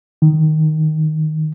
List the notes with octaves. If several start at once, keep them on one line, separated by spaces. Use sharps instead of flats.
D#3